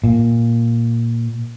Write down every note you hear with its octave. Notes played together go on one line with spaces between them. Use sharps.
A#2